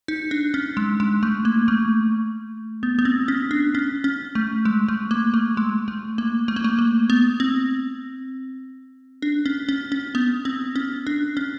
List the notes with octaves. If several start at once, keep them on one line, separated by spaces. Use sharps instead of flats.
D#4
D4
C#4
G#3
G#3
A3
A#3
A3
B3
B3
C4
C#4
D4
C#4
C#4
A3
G#3
A3
A#3
A3
G#3
A3
A#3
A3
A#3
A3
A#3
B3
C4
D4
C#4
C#4
C#4
B3
C4
C#4
D4
C#4